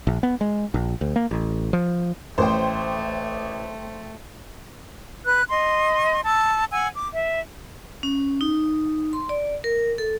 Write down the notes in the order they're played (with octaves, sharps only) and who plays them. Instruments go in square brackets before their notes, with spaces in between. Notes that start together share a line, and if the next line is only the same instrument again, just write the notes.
[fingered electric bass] A#1
B3
G#3
A#1
D2
A#3
A1
F3
[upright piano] A1 [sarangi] A3 [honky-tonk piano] C5 G5
[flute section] B4 F#6
D#5 C6
A5 E6
F#5 G#5 E6
D6
E5
[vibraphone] C#4
D#4
C6
D5
A#4
A4